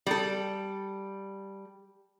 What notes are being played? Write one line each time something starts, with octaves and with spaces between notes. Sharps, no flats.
G3 A4